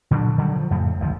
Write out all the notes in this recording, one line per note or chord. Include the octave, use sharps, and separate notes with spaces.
A#2 D3 F#3 D4
D3 D#3 F#3 G3
F3
F2 A2 C#3
G#1 D2 F3